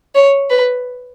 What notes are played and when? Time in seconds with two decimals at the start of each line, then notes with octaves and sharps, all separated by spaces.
0.15 C#5
0.50 B4